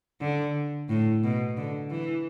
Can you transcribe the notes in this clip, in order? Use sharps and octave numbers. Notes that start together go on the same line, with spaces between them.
D3
A2
B2
D3
E3